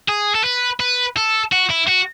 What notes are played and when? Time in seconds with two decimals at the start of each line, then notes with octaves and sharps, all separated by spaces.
0.09 G#4
0.35 A4
0.44 B4
0.80 B4
1.17 A4
1.53 F#4
1.70 E4
1.88 F#4